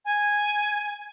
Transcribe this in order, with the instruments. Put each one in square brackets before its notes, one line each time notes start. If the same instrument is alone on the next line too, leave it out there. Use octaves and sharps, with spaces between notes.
[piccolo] G#5